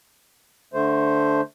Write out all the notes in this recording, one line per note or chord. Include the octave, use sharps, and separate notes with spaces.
D3 A3 C5